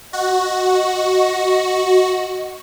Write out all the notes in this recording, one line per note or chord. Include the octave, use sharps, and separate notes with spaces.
F#4 D#5